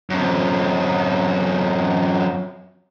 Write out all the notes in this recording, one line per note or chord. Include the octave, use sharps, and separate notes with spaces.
F#2 C4